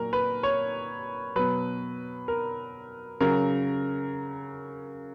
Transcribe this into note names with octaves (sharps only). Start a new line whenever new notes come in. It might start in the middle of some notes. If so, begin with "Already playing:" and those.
Already playing: A#2 F#3 A#4
B4
C#5
B2 F#3 B4
A#4
C#3 F#3 A#4